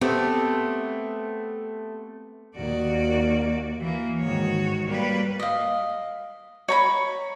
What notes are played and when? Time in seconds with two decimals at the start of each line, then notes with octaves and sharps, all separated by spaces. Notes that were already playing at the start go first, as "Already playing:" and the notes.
0.01 A3 B3 C4 G4
2.56 D#2 D#3 A#3 F#4 D5
3.80 E3 A#3
4.19 G#2 D#3 F#4 C#5
4.87 G3 A#3 B4
5.40 D#5 F5
6.68 C#5 A#5 B5